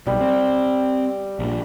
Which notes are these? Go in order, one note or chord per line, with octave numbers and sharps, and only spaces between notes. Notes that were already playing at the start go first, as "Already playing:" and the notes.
B1 B2 G3
C4
A#1 A#2